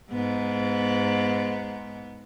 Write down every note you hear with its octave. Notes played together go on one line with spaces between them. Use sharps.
G#2 B3